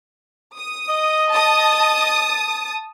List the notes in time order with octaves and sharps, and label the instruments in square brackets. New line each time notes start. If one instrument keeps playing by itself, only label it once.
[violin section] D#6
[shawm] D#5
[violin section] A5 D#6